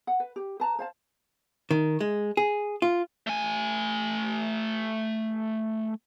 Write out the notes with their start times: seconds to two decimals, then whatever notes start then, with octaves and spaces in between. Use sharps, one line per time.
0.07 F#5
0.20 B4
0.36 G4
0.60 B4 A5 A#5
0.79 C5 F5 A5
1.71 D#3
2.01 G#3
2.37 G#4
2.82 F4
3.27 A3 G#5